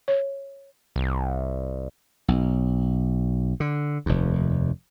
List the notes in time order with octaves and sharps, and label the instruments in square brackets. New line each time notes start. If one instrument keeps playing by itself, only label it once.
[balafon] C#5
[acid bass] C2
[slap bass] B1
D3
F1 D#2